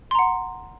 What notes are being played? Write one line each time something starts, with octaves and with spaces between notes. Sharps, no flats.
F#5 A#5 C6